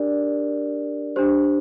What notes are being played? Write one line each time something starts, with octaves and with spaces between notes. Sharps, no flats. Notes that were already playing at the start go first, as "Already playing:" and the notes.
Already playing: D4 G4 A#4 D5
D4 G4 C5